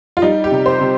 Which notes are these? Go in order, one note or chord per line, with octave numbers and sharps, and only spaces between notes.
F4
G3 D#4
G4
C3
C5
C3